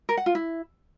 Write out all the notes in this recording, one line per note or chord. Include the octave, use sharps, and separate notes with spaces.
A#4
F#5
F4
E4